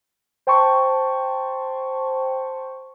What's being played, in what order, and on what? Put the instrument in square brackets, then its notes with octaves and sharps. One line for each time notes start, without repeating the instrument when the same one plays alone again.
[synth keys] C5 G5 A5 C6 C#6